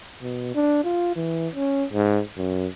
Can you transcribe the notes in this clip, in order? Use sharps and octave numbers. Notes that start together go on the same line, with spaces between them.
B2
D4
F4
E3
C#4
G#2
F#2